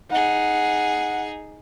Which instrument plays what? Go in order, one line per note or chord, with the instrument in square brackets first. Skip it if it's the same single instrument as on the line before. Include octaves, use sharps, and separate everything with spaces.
[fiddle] D#4 G#4 [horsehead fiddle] F#5